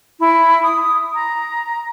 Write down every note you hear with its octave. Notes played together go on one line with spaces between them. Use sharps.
E4
D#6
A#5